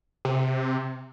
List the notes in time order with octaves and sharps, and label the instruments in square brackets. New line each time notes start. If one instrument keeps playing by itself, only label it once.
[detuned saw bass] C3